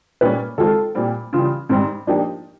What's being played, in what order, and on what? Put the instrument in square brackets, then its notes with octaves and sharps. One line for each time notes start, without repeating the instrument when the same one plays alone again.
[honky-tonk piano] A#2 G3 A#3 C#4 [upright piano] B4
[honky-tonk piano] D#3 G#3 C4 F4 [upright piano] A4
[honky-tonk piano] A#2 G3 C4
[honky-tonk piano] C#3 E3 G3 [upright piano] F4
[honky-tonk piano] G#2 D#3 G3 [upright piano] C4
[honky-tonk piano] F3 A#3 D#4 G4 [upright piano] D4